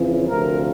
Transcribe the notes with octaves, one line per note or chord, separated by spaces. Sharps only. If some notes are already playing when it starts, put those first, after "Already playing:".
Already playing: F2 C#3 E3
D2 C3 F3 A#4